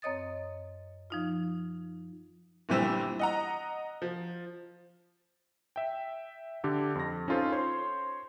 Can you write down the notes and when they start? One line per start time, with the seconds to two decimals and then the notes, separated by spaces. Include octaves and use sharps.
0.02 F#2 C4 C#5 D#5 D#6 A6
1.10 F3 D#4 F4
2.69 G1 A#2 E3 G3 C4 E6
3.19 D#5 F#5 A#5
4.02 F3
5.76 E5 G5
6.64 D3 D4 G4 A4
6.95 F2 A#6
7.28 C#4 D#4 F4 A4 C5
7.52 C5 C#5 C6